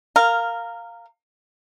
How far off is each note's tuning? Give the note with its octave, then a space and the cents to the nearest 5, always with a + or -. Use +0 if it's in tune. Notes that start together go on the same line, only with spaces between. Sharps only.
A#4 -15 F5 +0